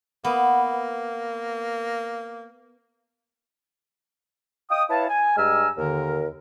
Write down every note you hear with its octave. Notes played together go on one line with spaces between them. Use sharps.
A#3 B3
D#5 F5 G5 D#6
E4 B4 C#5 F5 A5
G#5
G2 G#3 G#5 A#5 E6 F6
D#2 D3 A#4